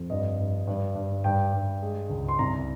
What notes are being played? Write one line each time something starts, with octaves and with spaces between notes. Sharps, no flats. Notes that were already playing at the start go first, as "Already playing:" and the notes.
Already playing: F2
G2 D#5
G2
G2
G2
G2 G5
G2
G#3
C#2
C6
C2 A#5